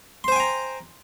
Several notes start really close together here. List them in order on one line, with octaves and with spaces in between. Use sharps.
C6 C5 G#5 G5 A#5